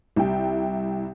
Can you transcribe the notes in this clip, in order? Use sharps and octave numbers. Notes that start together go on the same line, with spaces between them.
C2 E4 G5